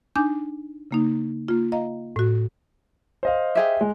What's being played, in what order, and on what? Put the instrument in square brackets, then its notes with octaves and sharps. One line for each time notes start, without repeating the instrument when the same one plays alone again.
[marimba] D4 D#4 G#5 D6 G6
C#3 A#3 D#4
A#3 F4
D#5 F5 A#5
A2 F#4
[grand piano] C5 D#5 F5
[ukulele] G4 G#4 E5
[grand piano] G#3